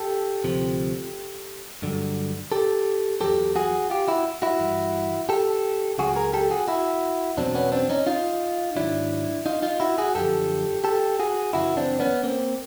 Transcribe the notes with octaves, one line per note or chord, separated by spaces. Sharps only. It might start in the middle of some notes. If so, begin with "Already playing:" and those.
Already playing: G4 A4
D2 C3 F3
G2 D3 F#3
G4 A4
E2 B2 F#3 G4 A4
F#4 G#4
F4 G4
E4 F#4
E4 F#4
G2 E3
G4 A4
C#2 C#3 F#3 F#4 G#4
G#4 A#4
G4 A4
F#4 G#4
E4 F#4
E2 B2 F#3 C4 D4
B3 C#4
C4 D4
C#4 D#4
D#4 F4
G#2 D#3 F#3 D4 E4
D#4 F4
D#4 F4
E4 F#4
F#4 G#4
F#2 D3 F3 G4 A4
G4 A4
F#4 G#4
F#2 C#3 E3 E4 F#4
C4 D4
B3 C#4
A#3 C4